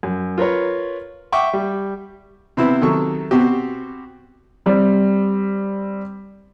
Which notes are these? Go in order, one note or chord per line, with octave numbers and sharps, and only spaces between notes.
F#2
F4 A#4 B4 C#5
E5 F#5 G5 C#6 D6
G3
C3 B3 C4 E4
C3 D#3 F#3 A4 C#6
B2 C4 F#4 G4
G3 C4